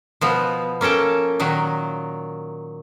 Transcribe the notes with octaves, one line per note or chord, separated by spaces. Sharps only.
B2 F3 B3
A#3 C#4 A4 G5 A5
A#2 D#3 F#3